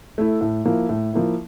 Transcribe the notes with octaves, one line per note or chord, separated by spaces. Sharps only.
A3 E4
A2
F3 A#3 E4
A2
F3 A#3 E4